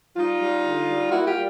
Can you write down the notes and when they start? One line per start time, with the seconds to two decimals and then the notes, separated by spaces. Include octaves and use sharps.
0.16 G3 D#4 F4
0.40 G3
0.64 D3
0.88 G3
1.11 A#3 E4 F#4
1.26 F4 G4
1.34 G3